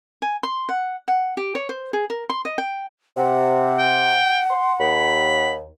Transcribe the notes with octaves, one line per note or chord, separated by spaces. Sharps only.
G#5
C6
F#5
F#5
G4
C#5
C5
G#4
A#4
C6
D#5
G5
C3 F#5
G5
C6
D#2 B5